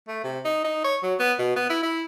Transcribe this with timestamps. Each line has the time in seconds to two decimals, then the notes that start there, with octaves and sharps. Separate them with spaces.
0.08 A3
0.24 C3
0.45 D#4
0.64 D#4
0.84 C#5
1.03 F#3
1.20 B3
1.39 B2
1.56 B3
1.70 E4
1.83 E4